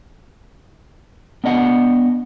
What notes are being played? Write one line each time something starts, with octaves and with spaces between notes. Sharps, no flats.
B3 D4 D#5 F#5